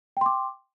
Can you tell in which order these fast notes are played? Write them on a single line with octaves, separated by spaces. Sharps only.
G5 C6 D6